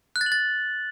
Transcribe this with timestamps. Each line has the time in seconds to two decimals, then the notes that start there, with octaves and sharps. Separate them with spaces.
0.16 F#6
0.21 A6
0.26 F#7
0.32 A6